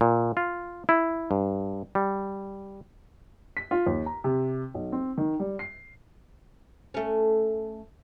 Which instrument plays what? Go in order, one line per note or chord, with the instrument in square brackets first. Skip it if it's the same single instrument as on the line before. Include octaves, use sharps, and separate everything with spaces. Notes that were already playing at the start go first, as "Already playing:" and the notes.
[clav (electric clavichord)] A#2
F4
E4
G2
G3
[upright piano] B6
F4
D#2
A#5
C3
B1
C4
D#3
G3
C7
[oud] A3 C#4